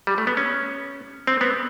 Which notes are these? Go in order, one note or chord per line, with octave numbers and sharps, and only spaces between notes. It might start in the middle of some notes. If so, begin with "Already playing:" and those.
G3
A3
B3
C#4
C4
B3